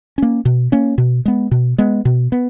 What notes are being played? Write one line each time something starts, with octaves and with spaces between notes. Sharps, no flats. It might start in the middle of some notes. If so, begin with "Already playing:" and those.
A#3 C#4
B2
A#3 C#4
B2
G#3 B3
B2
G#3 B3
B2
B3